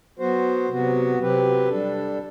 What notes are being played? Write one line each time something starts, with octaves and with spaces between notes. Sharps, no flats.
F#3 B3 F#4 C5
C3 F#3 B3 F#4
C3 F#3 C4 G4 B4
G3 D4 A4